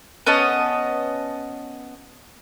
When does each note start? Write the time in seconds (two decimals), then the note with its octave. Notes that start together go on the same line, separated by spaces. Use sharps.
0.27 B3 C#4 D#5 A5